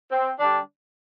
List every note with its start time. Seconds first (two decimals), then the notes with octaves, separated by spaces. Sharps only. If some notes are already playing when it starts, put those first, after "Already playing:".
0.11 C4
0.39 D3 G3 D4